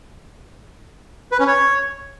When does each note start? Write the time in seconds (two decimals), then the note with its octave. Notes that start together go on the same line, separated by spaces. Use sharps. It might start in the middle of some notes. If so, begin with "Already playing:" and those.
1.32 B4
1.39 C#4
1.47 C#5